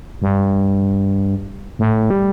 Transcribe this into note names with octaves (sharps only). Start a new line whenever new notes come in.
G2
A2
G3